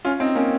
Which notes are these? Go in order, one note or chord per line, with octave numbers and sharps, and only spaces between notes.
C#4 F4
C4 D#4
A#3 C#4